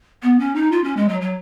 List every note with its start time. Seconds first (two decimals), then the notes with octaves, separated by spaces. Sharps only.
0.22 B3
0.39 C#4
0.55 D#4
0.71 F4
0.84 C#4
0.97 G#3
1.09 F#3
1.21 F#3